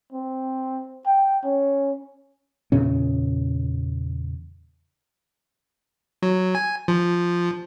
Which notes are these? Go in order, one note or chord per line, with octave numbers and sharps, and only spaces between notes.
C4
G5
C#4
E2 A#2 C#3 C#4
F#3
G#5
F3